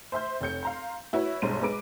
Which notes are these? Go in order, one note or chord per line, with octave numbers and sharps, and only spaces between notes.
C5 E5 C6 G6
F1 C#5 G6 C#7
F5 A#5 C6
E4 F#4 B4 C#5
B1 G2 G#3 C5 C#5 D#7
G#3 B4 D6 D7